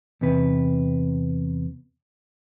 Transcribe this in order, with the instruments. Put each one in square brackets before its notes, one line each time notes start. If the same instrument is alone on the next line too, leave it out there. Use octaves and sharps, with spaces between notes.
[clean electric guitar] E2 C3 B4